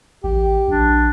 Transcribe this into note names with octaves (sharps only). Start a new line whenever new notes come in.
A1 G4
A#1 D4